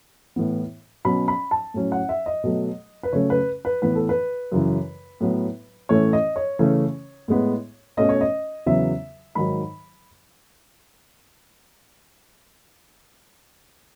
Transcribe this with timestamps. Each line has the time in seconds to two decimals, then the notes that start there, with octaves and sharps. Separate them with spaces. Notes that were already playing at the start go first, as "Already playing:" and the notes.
0.36 A2 E3 B3
1.05 B2 F#3 C#4 B5
1.28 B5
1.51 A5
1.74 A2 F#3 C#4
1.92 F#5
2.09 E5
2.26 D#5
2.44 B2 F#3 A3
3.03 B4
3.13 C#3 F#3 A3 C#4 C#5
3.30 B4
3.65 B4
3.82 A2 E3 B3 B4
3.95 A4
4.09 B4
4.52 F#2 C#3 E3
5.20 A2 F#3 B3
5.89 A2 E3 A3 C#4 C#5
6.13 D#5
6.36 C#5
6.59 C#3 E3 A3 C#4
7.28 A2 G#3 B3
7.97 B2 A3 C#4 D#5
8.09 C#5
8.21 D#5
8.66 E2 C#3 F#3 B3 E5
9.35 G#2 D#3 F#3 B5